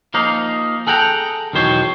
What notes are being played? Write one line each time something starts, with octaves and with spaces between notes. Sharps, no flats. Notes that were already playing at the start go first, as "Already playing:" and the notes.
F3 A#3 D#4 F5
G#4 A4 F#5 G5 A#5
B1 E2 D#3 C5 C#5